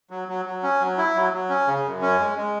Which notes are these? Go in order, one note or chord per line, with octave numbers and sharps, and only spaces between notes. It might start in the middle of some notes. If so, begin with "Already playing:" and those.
F#3
F#3
F#3
C#4
F#3
E4
F#3
F#3
C#4
C#3
F#2
C#4
G#3
G#3